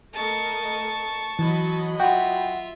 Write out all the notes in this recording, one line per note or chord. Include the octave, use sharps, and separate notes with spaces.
A3 A#4 D#5 A5 C#6
E3 F#3 D#5 B5
F4 F#4 E5 G5